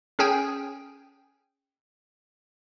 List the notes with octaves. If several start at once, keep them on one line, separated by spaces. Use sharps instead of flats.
C#4 G#4 G5 G#5